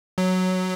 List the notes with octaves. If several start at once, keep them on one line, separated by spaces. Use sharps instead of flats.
F#3